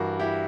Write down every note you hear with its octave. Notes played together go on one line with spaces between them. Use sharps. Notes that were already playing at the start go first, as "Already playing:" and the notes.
Already playing: G2 E3 F#4 A#4
E4 G4